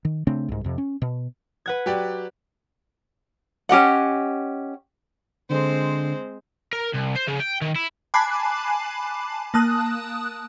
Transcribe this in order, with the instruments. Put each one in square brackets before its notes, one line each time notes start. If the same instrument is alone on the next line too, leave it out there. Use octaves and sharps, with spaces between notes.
[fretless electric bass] D#3
C#3 A3 C4 D4
C2 G#2
F2 C3
C#4
B2
[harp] B4 F#5 G#6
[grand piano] F#3 G4 D5
[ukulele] C#4 G4 D#5 F#5
[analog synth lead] D3 [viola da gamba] G#3 C4 C5
[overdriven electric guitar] A#4
C2
C5
C#3
G5
D#3
E4
[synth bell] G#5 A5 B5 D6 F#6 C7
A#3 A5 D#6 F#6